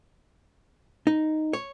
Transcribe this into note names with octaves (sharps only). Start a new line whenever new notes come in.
D#4
C#5